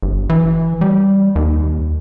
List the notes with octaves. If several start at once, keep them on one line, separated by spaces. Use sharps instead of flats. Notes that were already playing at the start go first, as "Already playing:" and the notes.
G1
E3
G3
D#2